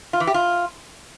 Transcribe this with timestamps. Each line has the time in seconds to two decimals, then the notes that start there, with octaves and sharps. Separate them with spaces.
0.13 F4
0.20 E3
0.27 G4
0.34 F4